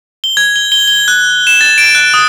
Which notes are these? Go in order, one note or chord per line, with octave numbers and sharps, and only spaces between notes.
G7
G#6
G7
G7
G7
F#6
E7
A6
D7
F#6
D#6